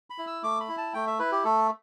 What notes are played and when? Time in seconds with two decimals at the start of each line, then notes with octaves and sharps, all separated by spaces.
0.10 B5
0.18 E4
0.27 E6
0.43 A3 D6
0.60 B5
0.69 E4
0.77 A5
0.94 A3 G5
1.07 E5
1.19 E4 B4
1.32 G4
1.45 A3 A4